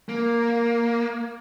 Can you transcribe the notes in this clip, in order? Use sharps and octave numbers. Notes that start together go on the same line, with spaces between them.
A#3